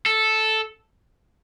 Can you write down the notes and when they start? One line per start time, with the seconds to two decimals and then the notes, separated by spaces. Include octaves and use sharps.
0.06 A4